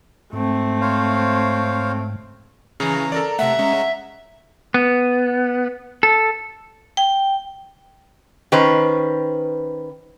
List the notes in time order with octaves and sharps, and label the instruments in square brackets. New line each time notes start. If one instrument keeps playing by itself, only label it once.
[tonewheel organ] G#2 [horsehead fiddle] A3 C4
[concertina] C5 C#5 F5
[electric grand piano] C#3 [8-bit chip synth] E3 C#4 [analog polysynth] A#5
[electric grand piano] A4 A#4 D5
[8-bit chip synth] C3 A3 [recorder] E5 [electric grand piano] F#5
[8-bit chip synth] G#3 C#4
[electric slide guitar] B3
A4
[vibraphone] G5
[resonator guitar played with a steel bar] D#3 C#4 B4 C5